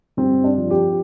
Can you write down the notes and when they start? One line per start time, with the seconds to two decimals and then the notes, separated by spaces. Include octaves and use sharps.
0.17 G2 C4
0.44 D4
0.58 F3
0.71 G4